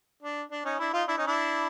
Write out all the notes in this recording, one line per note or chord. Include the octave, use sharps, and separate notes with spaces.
D4
D4
C#4 D#4
D4 E4
D#4 F4
D4 E4
C#4 D#4
D4 E4